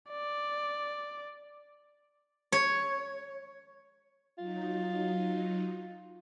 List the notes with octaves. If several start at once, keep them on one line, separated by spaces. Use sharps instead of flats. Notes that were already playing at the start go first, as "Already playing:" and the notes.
D5
C#5
F#3 D#4 F4